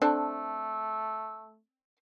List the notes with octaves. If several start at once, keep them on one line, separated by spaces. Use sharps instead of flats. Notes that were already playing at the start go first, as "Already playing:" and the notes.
A3 C4 D4 A4